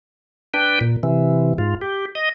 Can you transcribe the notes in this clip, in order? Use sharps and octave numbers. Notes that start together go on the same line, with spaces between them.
D4 B4 G5
A#2
C3 E3
G#2 F4
G4
D#5